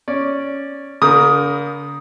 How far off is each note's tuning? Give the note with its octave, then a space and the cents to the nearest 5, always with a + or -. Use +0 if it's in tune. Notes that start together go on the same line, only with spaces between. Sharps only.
C#4 +0 D5 +0
D3 -45 A#4 +15 D#6 +0